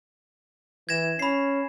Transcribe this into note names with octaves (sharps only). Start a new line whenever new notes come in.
E3 G#6 A#6 E7
C#4 B5 C7